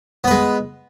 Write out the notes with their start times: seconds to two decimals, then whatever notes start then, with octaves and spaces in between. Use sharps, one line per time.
0.24 B3
0.27 B4
0.31 G#3